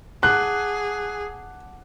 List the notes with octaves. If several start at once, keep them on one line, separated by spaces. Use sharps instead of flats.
G#4 F#5 A5 D6 F#6